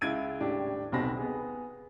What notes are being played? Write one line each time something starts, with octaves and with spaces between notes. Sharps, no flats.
C#2 E4 G#6 D7 D#7
D#1 A2 D4 G4
D#1 B1 B2 C4 B5 A#6
B3 G#4